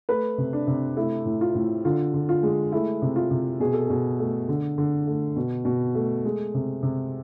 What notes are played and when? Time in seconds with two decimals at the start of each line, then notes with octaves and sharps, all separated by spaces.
0.09 A3 B4
0.38 C3
0.53 D4
0.67 C3
0.96 A3 E4
1.25 A2
1.41 F4
1.55 A2
1.85 D3 F4
2.14 D3
2.29 F4
2.43 G#3
2.72 A3 E4
3.02 C3
3.16 F4
3.31 C3
3.60 B2 G#4
3.73 A4
3.88 B2 G#4
4.19 A3
4.48 D3
4.78 D3
5.07 A3
5.36 B2
5.65 B2
5.95 A3
6.25 G#3
6.54 C3
6.83 C3